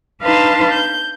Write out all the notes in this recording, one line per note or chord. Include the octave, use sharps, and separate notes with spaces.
D4 D#4 B4 F5 A5 C6
G6